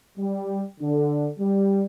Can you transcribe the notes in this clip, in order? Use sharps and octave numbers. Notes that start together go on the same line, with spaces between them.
G3
D3
G3